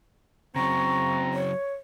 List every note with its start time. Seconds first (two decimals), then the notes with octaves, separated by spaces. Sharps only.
0.56 C#3 F#3 C4 A#5 C#6
1.33 C#5